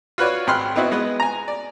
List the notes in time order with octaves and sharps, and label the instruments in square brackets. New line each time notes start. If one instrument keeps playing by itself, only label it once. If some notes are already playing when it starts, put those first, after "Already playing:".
[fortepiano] F4 F#4 B4 C#5 D5
G#1 G5 B5 C6 F6 F#6
B3 C4 D#4 E4 F#4
G#3 B3 B4
G#5 A#5
D5